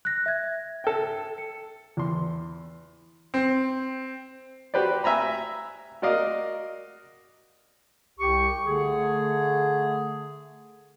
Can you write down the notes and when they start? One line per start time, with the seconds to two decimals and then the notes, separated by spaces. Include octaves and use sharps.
0.05 F#6 A#6
0.26 E5 G#6
0.84 A4 G5
1.38 C#7
1.97 E2 C6
3.34 C4
4.74 F#4 G4 B4 C5 D5
5.04 E5 G#5 A#5 B5
6.02 F#4 A#4 D5 D#5 F5
8.19 C2 G4 C#6
8.66 D3 A3 G#4